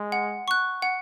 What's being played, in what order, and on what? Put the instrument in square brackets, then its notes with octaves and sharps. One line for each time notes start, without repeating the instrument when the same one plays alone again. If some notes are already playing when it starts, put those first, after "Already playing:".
Already playing: [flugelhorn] G#3
[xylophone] F#5
C#6 F#6
F#5